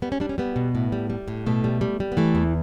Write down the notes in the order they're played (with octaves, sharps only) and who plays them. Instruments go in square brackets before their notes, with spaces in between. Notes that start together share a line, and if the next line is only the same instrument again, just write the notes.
[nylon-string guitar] G3 B3
C#4
G3 D4
C#4
G3 B3
B2
A2
G3
G3
A2
B2 A3
G3
G3
G3
B3
E3 A3
E2